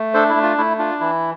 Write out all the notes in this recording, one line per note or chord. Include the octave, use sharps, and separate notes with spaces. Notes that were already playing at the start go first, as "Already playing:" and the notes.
Already playing: A3
D4 A4 C5
E4
A3
F4
A3 E4
D4 F4
E3 E4